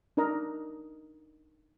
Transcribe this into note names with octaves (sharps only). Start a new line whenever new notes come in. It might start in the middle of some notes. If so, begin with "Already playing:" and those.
D4 D#4 A#4 D#5 A#5